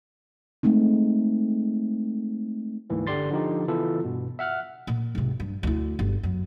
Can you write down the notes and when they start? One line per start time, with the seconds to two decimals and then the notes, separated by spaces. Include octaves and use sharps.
0.63 G#3 A3 C4 D#4
2.90 D2 G#2 E3 A#3
3.07 G1 D3 G4 D5 C6 A6
3.30 D3 F3 D#4 G4
3.68 C#3 E3 B3 E4 F4 A4
4.04 G2 B2
4.39 E5 F#5 F6 F#6
4.87 A#2
5.15 G#1 C3
5.40 G2
5.63 D2 E4
5.99 G1
6.23 F#2